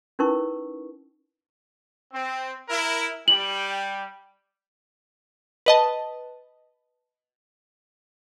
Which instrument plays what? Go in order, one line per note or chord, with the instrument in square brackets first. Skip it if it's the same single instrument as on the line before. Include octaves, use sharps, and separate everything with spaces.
[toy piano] C#4 D#4 E4 A#4 B4 C#6
[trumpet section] C4
E4 A#4
[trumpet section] G3 G5 [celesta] F#7
[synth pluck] B4 D#5 A5